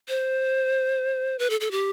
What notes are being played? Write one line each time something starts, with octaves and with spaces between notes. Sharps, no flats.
C5
B4
A4
A4
G4